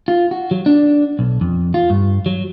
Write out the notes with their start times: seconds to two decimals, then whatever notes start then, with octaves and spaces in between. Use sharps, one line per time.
0.08 F4
0.31 F#4
0.51 F#3
0.66 D4
1.19 B1
1.41 F2
1.74 F4
1.90 G2
2.26 F#3